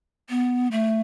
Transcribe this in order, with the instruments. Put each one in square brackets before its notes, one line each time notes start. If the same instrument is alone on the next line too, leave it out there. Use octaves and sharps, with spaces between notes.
[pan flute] B3
A3